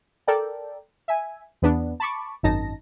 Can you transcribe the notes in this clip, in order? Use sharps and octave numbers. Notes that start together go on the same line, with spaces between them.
A4 A#4 D5 G5
E5 G#5
E2 B3 D4
A5 B5 C#6 D6
G#1 F#2 D#4 A5 A#6